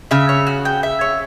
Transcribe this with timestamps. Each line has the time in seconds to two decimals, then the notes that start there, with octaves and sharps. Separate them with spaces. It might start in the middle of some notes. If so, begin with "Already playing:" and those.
0.11 C#3 E5
0.29 C#5
0.47 F#4
0.65 G5
0.83 E5
1.01 C#5